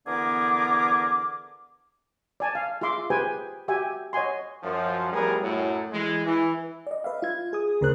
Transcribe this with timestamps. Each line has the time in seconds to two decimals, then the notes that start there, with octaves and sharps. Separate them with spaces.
0.06 D3 E3 B3 G#4 A#4 D6
2.40 D5 G#5 A5
2.55 F5
2.81 F4 G#4 E5 C6 D6
3.10 G4 G#4 B4 C5 G5 G#5
3.68 F#4 G4 E5 G5 G#5
4.13 C#5 D#5 F#5 G#5 C6
4.63 F#2 F3
5.12 A2 F3 G3 B3 G#4 A#4
5.42 F#2 A2 F#3
5.93 E3 G#3
6.25 E3
6.87 D5 D#5
7.04 B4 E5 F5
7.22 F4 G#6
7.53 G#4 D#6
7.81 D2 C#3 A#4 C5 F#6